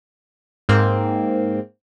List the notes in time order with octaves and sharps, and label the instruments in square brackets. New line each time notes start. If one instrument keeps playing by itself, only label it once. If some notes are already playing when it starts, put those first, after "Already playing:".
[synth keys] G#2 A#3 C4